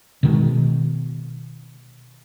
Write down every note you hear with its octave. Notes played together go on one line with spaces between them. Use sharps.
B2 D#3 G#3